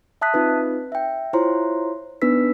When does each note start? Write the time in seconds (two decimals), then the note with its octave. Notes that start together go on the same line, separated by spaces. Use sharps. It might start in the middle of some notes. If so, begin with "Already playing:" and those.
0.21 E5 A5 D#6 F#6 B6
0.34 C4 D#4 F4 B4
0.92 E5 G5
1.33 E4 F4 C5 C#5 A#5 C6
2.22 B3 D4 D#4 B4 E6 B6